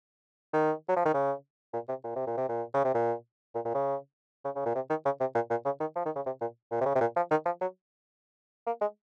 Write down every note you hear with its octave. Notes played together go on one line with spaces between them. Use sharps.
D#3
F#3
F3
D#3
C#3
A#2
C3
A#2
C3
A#2
C3
A#2
C#3
C3
A#2
A#2
A#2
C#3
C#3
C#3
A#2
C3
D#3
C#3
C3
A#2
A#2
C#3
D#3
F3
D#3
C#3
C3
A#2
A#2
C3
C#3
C3
A#2
F3
D#3
F3
F#3
A#3
G#3